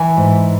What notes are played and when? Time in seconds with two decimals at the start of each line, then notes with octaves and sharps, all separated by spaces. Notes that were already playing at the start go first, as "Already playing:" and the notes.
Already playing: E3 G#5
0.17 G#2